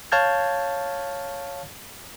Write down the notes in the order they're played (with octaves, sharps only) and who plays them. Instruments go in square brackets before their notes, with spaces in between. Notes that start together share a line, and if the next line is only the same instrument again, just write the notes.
[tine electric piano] C#5 F5 A5 F6 G6 G#6